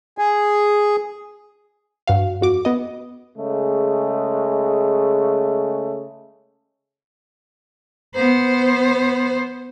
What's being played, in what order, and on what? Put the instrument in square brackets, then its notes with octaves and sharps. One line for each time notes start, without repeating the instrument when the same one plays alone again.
[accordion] G#4
[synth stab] G2 F#4 F5
F2 F#4 D6
B3 D#5
[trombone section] C#3 G#3 A3
[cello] B3 C5